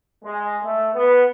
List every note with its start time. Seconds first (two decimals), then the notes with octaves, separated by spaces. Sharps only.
0.24 G#3
0.64 A3
0.95 B3